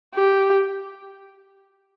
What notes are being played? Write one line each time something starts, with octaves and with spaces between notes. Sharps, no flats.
G4